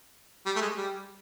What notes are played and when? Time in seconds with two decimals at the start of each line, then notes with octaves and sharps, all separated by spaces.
0.46 G3
0.56 A3
0.61 G#3
0.77 G3